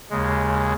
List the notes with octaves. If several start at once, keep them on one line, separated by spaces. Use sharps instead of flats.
D#2 C#3 G#3